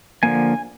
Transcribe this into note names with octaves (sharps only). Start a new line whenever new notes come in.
D3 F3 A#3 G#5